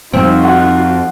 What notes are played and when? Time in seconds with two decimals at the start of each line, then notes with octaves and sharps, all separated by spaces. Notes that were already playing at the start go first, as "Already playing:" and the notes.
0.13 F2 C4 D#4 F4 F#4
0.45 F#5